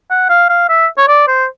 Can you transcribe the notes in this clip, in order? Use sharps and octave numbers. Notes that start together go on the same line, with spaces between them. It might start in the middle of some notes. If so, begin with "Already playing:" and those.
F#5
F5
F5
E5
C#5
D5
C5